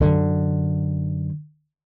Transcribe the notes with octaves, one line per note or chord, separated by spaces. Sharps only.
F#2 D3